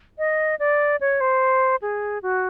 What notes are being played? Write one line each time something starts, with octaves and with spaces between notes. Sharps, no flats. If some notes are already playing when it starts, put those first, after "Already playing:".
D#5
D5
C#5
C5
G#4
F#4